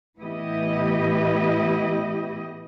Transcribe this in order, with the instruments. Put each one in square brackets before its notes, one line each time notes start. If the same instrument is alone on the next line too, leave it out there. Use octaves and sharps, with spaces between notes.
[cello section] A2 E3 B3 E4 G4 D#5